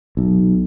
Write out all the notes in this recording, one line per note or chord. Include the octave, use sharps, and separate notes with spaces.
B1